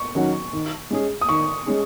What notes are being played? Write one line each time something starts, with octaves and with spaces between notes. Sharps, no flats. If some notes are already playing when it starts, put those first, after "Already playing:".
Already playing: C#6
D#3 F#3 C#4 F#4
D#3
G#3 C#4 G#4
D#6
D#3 C#6
G#3 C#4 G#4